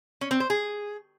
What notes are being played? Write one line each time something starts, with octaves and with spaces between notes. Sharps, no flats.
C#4
C4
C5
G#4